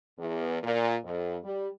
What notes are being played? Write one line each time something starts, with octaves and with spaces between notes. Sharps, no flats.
E2
A#2
F2
G3